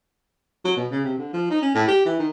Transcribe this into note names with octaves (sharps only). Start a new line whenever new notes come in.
F#3
B2
C#3
C3
D3
F3
D#4
C#4
A2
G4
E3
D#3